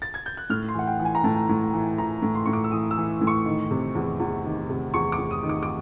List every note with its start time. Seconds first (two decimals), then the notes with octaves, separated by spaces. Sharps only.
0.02 A6
0.14 G#6
0.26 G6
0.37 F#6
0.50 A2 F6
0.69 C6
0.74 E3 F#5
0.87 G5
0.99 E3
1.05 G#5
1.15 A#5
1.24 A2 A5
1.49 A2
1.73 E3
1.98 E3 A#5
2.22 A2
2.35 C6
2.45 A2 C#6
2.53 D6
2.64 E6
2.71 E3 D#6
2.91 E6
2.97 E3
3.21 A2
3.27 C#6
3.46 D#3
3.71 C3
3.95 E2
4.20 E2
4.44 D#3
4.69 C3
4.94 E2 C#6
5.12 D6
5.18 E2
5.31 D#6
5.43 D#3
5.49 D6
5.63 D6